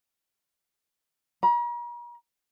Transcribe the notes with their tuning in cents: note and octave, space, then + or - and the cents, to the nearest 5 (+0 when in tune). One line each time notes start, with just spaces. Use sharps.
A#5 +45